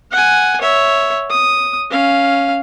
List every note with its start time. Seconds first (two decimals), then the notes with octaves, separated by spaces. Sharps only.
0.11 F#5 G#5
0.61 C#5 E5
1.30 D#6
1.91 C#4 F5